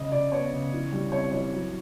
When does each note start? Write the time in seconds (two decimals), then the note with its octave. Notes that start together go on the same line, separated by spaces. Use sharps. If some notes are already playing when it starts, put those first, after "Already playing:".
Already playing: C#3 D#5
0.12 C#3 D5
0.32 B3 C#5
0.52 C#3
0.72 E3
0.92 G3
1.12 C4 C#5
1.32 E3 C#5
1.53 F#3